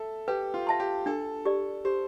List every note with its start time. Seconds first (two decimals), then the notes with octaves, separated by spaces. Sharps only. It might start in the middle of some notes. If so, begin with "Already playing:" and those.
Already playing: A4 E5
0.28 G4 B4
0.54 F4
0.67 E5 A5 C6
0.80 G4
1.06 D4 A4
1.46 G4 D5
1.85 G4 C5